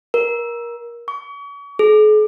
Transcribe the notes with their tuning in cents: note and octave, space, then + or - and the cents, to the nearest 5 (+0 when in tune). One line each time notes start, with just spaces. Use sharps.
A#4 +20
C#6 +40
G#4 +45